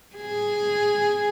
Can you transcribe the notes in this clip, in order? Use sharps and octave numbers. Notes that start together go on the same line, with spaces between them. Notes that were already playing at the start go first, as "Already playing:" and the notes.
G#4